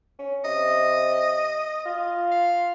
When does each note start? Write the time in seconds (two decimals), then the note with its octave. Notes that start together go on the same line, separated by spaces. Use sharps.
0.19 C#4
0.44 C3 D#5
1.86 F4
2.31 F5